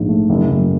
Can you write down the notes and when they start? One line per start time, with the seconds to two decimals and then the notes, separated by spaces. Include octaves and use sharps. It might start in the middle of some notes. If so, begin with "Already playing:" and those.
Already playing: A#1 G#2
0.08 A3
0.30 F#1
0.50 F#1